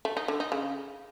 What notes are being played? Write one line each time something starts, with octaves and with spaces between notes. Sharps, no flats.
A3
D#4
D3
D#4
C#3